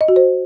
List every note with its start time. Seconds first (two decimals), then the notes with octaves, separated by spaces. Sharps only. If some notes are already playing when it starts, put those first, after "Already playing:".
0.01 D#5
0.08 F#4
0.16 C5